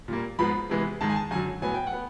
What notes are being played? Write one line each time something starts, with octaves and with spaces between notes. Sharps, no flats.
A#2 G3 A#3
G#2 F3 G#3 B3 B5
C3 E3 G#3 B3
G#2 D#3 G#3 A5
G#5
A5
F#2 D3 F#3 G#5
A2 F#3 B3 G#5
G5
F#5
B3